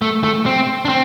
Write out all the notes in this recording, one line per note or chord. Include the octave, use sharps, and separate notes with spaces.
A3
A3
C4
D4
C4